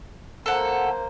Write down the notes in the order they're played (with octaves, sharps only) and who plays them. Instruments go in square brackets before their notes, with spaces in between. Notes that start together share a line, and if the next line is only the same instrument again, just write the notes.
[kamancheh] A#3 C5 [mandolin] A4 F#5